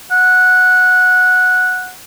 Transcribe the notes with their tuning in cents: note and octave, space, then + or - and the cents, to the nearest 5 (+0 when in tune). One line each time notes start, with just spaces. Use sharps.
F#5 -10